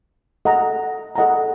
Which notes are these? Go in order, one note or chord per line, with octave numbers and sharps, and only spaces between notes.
A4 D#5 F#5 A#5
A4 D#5 F#5 A#5